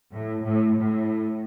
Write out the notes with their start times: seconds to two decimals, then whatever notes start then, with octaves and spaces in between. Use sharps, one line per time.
0.12 A2
0.44 A2
0.76 A2